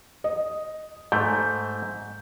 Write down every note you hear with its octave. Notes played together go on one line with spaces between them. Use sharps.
D#5
G#2 A3 G6